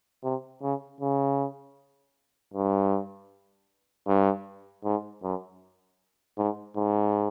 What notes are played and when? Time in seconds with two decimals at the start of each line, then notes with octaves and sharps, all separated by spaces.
0.23 C3
0.62 C#3
1.01 C#3
2.54 G2
4.07 G2
4.84 G#2
5.23 F#2
6.38 G#2
6.77 G#2